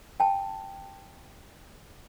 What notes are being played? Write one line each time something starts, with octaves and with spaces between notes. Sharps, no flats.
G5 A5